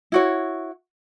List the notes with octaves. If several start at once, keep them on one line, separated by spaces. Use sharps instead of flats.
E4 F#4 C#5